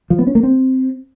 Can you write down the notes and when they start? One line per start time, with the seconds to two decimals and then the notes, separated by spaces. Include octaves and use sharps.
0.10 F3
0.19 B3
0.27 C#4
0.35 A#3
0.43 C4